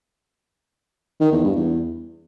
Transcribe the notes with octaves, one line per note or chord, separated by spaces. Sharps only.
D#3
E2
G2
E2